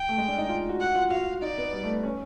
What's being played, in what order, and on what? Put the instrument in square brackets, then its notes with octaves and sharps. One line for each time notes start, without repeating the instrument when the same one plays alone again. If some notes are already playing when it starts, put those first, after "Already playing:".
Already playing: [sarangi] G5
[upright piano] A3
G#3
D4
D#4
F4
F#4
[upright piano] F#4 [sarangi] F#5
[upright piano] F4
[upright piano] F#4 [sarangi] F5
[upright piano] D#4 [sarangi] D5
[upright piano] B3
G3
A3
B3
C#4